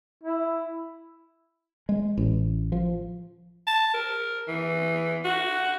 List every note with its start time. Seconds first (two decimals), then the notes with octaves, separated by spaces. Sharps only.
0.23 E4
1.89 G#3
2.17 A1
2.72 F3
3.67 A5
3.94 A#4
4.48 E3
5.25 F#4